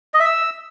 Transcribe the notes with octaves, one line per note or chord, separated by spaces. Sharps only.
D#5
E5
E6